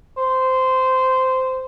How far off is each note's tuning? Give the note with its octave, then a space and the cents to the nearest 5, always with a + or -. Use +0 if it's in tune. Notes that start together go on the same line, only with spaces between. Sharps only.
C5 -15